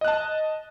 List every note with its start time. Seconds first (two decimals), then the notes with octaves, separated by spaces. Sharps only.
0.01 D#5
0.05 F#6
0.08 A5